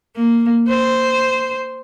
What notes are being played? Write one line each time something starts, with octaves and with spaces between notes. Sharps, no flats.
A#3
C5